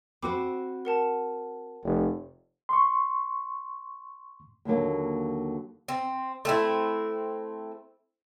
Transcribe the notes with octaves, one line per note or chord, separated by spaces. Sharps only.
C4 F#4 C5 B5 D6
A#4 F#5 A5
F1
C6 C#6
D#2 D3 F#3 A#3
C4
A3 C4 E4